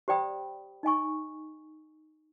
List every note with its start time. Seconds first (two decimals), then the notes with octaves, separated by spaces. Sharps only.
0.08 G4 C5 D5 G5 B5 D#6
0.83 D#4 D#5 G#5 C#6